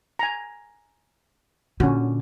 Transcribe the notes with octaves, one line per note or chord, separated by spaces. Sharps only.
G#5 A#5
A#2 D3 C#4 F#4